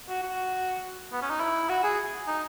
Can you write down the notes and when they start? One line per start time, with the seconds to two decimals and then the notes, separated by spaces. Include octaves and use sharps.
0.09 F#4
0.23 F#4
1.13 B3
1.22 C#4
1.30 D#4
1.41 E4
1.69 F#4
1.84 G#4
2.28 D#4